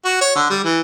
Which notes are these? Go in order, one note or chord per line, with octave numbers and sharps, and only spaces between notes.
F#4
C#5
D3
G3
E3